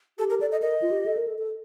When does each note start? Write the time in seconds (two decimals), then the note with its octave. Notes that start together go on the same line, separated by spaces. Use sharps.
0.19 G4 A4
0.30 A#4
0.41 A4 D5
0.52 D#5
0.62 A#4 D#5
0.82 F4
0.91 G4
1.06 A4
1.17 A#4
1.27 A4
1.38 A4